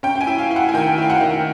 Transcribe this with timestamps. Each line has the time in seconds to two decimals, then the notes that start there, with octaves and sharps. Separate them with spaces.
0.03 C#4 G5
0.15 G5
0.21 G#5
0.27 E4
0.39 F5
0.51 E4
0.56 F#5
0.69 G#5
0.74 D#3 G5
0.98 E4 F5
1.10 F#5
1.21 D#3